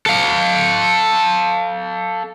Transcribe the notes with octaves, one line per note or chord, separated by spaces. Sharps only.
A4 F5